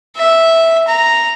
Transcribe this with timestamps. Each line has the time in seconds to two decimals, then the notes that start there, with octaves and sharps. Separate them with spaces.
0.16 E5
0.88 A#5